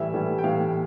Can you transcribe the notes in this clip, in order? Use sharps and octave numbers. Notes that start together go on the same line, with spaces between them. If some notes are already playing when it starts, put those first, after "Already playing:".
Already playing: A2 E3 G3 E5
A2 E3 G3
G5
A2 E3 G3 F5